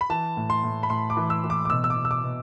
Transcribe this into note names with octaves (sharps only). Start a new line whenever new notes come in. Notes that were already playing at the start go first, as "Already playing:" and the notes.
B5
E3 A5
A2
C6
A2
B5
A2 C6
D6
E3
E6
E3
D6
D6
B2 E6
E6
D6
B2
E6
D6
B2